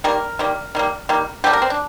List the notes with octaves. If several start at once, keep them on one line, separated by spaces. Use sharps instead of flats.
D#3 G3 A#3 A#4
D#3 G3 A#3
D#3 G3 A#3
D#3 G3 A#3
D3 G3 A#3 G4
A#4
C4
D4